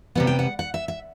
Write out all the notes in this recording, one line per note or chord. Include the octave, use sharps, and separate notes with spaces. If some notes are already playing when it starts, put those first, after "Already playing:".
C3 G3 B3 F#5
G5
F#5
F#5
E5
E5